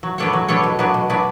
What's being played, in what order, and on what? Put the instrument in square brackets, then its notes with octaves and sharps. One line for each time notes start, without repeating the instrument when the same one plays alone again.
[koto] F#3
B3 D4 A4 C#5
F#3
B3 D4 A4 C#5
B2
F#3 B3 D4
B2
F#3 B3 D4